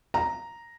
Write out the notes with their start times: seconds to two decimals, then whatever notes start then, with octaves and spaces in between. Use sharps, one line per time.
0.14 A#5